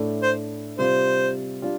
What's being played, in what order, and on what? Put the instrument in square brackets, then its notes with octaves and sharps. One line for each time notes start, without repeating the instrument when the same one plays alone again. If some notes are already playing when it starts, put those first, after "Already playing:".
Already playing: [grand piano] A2 A3 D4
[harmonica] C5
[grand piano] C3 G3 F4 [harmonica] C5
[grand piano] G3 D4 F4